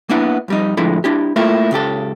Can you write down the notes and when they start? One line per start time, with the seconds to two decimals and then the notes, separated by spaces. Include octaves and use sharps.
0.09 A#3 B3 D4 E4 F#5
0.48 F2 G3 D#4
0.77 A2 D3 F3 G#3 E4 B5
1.04 D4 E4 G4
1.36 A3 A#3 E4 F4
1.71 C#2 C#3 G4 A4